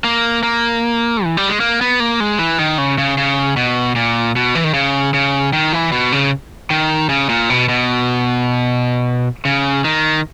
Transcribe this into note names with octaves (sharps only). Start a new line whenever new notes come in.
A#3
A#3
E3
G3
G#3
A#3
B3
A#3
G#3
E3
D#3
C#3
C#3
C#3
B2
A#2
B2
E3
D#3
C#3
C#3
D#3
E3
B2
C#3
D#3
C#3
A#2
B2
B2
C#3
D#3